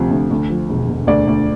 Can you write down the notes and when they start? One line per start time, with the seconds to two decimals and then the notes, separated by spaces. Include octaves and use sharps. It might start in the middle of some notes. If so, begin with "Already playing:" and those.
Already playing: D2 C3 F3
0.11 D2
0.31 D2
0.50 F3
0.69 E1
0.89 E1
1.07 D2 D5
1.27 D2